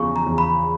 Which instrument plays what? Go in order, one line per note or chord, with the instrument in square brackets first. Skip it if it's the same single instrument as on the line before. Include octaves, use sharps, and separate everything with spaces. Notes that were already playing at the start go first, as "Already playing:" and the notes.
Already playing: [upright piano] E2 C#3 F3 [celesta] C#6
[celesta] A#5
[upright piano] E2
[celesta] B5